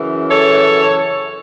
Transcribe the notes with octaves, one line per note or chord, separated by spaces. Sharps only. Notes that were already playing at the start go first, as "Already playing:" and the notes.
Already playing: F#2 C#3 E3
A4 C#5